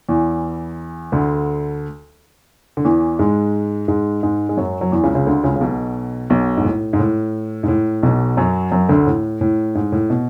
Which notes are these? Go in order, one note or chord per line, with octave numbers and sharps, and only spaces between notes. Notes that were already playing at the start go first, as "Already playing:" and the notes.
E2 E3
D2 D3
D3
E2 E3
G#2 G#3
G#2 G#3
G#2 G#3
G#3
F#2 F#3
F#3
E2 E3
C#2 C#3
C#2 C#3
D2 D3
C#2 C#3
C#3
B1 B2
B1 B2
G#2
A2
G#2
A2
G#2
A2
B1 B2
F#2 F#3
F#2 F#3
D2 D3
A2
A2
G#2
A2
B2